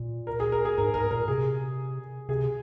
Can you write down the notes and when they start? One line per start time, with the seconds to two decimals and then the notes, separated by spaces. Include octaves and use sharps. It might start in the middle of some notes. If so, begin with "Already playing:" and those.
Already playing: A#2
0.27 A#4
0.40 G#4
0.52 A#4
0.65 G#4
0.78 G#2 A#4
0.94 G#2 A#4
1.11 A#2 A#4
1.28 C3 G#4
2.29 C3 G#4